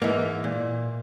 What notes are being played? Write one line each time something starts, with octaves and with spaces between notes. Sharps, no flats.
G#2 E3 A#3
A#2